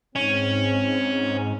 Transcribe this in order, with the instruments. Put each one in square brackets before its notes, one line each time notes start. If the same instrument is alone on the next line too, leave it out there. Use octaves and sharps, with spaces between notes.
[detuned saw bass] G#2 [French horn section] C4 [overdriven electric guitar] C#4